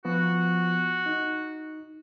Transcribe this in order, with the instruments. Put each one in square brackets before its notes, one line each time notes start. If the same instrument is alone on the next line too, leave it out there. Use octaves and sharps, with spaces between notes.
[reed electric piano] F3 B3 F4 [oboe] F#4
[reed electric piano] D#4